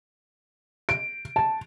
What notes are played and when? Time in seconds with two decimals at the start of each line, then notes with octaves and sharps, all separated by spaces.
0.89 D7
1.36 A5